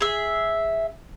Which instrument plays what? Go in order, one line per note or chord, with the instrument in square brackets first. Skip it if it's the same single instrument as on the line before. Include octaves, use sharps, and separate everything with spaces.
[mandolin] G#4 E5